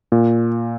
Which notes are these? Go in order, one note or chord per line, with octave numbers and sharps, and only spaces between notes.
A#2